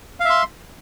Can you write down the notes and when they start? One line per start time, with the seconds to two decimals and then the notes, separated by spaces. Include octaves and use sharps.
0.20 F5
0.25 E5
0.30 C6